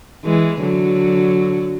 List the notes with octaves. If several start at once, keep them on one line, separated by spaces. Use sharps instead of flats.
E3 G#3
D3 F#3